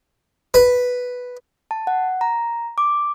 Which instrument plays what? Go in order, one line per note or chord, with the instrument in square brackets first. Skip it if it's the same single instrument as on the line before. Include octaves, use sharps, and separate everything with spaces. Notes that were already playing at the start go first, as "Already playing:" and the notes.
[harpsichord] B4
[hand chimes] A5
F#5
A#5
D6